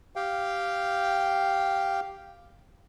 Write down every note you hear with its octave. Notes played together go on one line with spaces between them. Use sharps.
G4 F5 G5